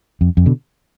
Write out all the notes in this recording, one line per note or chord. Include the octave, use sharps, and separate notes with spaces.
F2
F2
B2 D3